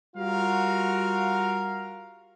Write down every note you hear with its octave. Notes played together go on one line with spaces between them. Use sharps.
G3 F4 F#4 A#4 F5